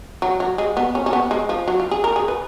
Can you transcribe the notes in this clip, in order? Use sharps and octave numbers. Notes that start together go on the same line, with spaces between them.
F#3
F#3
G#3
B3
C#4
C#4
B3
G#3
F3
F#3
F4
G#4
A#4
G#4
B4